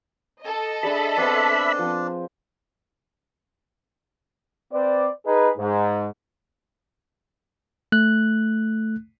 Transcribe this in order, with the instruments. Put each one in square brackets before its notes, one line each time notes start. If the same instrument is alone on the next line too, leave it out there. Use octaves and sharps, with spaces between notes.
[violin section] A4 D#5
[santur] D4 G#4 D5 [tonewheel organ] E5 B5
[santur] B3 C4 C5 [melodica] D4
[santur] F3 C4
[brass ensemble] C4 B4 C5 D5
D#4 G#4 B4
G#2
[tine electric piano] A3 F#6